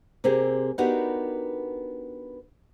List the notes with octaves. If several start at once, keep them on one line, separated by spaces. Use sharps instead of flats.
C3 A#3 C4 G4 G#4
B3 D4 D#4 F#4 G4 A#4